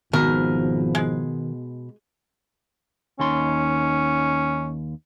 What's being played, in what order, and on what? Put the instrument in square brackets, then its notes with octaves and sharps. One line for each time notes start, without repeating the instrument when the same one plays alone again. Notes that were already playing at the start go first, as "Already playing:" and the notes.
[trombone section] G#1 G#2 F3 [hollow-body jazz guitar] B2 [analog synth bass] D#3 [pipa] A#4
[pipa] G#3
[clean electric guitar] D#2 D#4 C6 [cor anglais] C#4